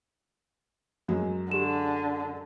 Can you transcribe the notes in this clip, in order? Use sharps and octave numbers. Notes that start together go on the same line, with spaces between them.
F#2 F#3 G#3
D3 G4 E7